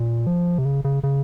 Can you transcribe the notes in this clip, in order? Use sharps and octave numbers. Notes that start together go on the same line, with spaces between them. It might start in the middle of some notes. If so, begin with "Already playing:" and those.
Already playing: A#2
F3
C3
C#3
C#3
C#3